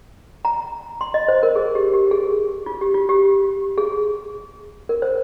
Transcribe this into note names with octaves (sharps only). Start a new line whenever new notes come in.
A#5
C6
D#5
C5
A#4
G#4
G4
G4
G#4
F4
G4
F4
G4
G#4
A#4
C5